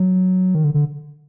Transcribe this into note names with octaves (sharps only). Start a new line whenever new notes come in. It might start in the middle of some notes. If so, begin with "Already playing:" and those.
Already playing: F#3
D#3
D3
D3